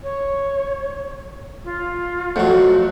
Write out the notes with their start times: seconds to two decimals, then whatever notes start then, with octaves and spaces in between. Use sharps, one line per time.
0.03 C#5
1.64 F4
2.36 F2 F#3 A3 F#4